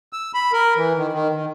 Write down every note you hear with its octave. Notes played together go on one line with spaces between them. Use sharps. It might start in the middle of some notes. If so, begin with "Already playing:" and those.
E6
B5
A#4
E3
D#3
D#3
D#3